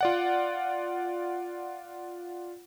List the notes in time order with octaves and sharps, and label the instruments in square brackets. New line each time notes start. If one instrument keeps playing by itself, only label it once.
[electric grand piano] F4 D5 F#5